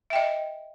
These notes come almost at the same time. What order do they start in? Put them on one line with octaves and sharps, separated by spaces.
E5 G5 D#5